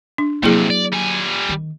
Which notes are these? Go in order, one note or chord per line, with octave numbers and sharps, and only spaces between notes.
D4
F2 C3 F#3 A#3 E4 G#4
D5
G3 G#5
D#3